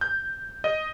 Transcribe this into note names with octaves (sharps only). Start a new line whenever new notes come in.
G6
D#5